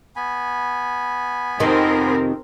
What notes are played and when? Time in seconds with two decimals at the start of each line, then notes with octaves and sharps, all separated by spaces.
0.16 B3 G#5 B5
1.60 F2 C3 D#3 C4 A#4